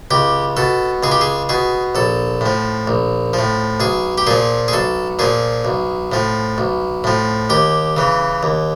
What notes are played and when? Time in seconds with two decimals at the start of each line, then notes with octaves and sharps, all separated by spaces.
0.11 C#2 G4
0.57 B2 A4
1.03 C#2 G#4
1.12 G4
1.21 G#4
1.49 B2 G#4
1.95 A#1 A4
2.41 A2 F3
2.87 A#1
3.33 F3
3.39 A2
3.80 B1 G#4
4.18 G4
4.27 A#2 F3 G#4
4.68 G#4
4.73 B1 A4
5.19 A#2 F3 G#4
5.65 B1
6.12 A2 F3
6.58 B1
7.04 A2 F3
7.50 D#2 G4
7.97 C#3 E3
8.43 D#2